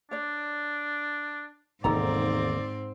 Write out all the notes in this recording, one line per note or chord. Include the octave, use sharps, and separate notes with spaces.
D4 C#5 D5
E1 D#2 G#2 C4 D#4 A4 D5 A#5